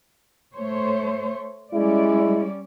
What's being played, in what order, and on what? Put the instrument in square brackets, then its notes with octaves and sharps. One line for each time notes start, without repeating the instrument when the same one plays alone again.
[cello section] A3 C5 C#5
[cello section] G3 C#4 D5 [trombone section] G#3 E4